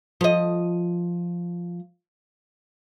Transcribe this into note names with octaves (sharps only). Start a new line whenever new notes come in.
F3 D#5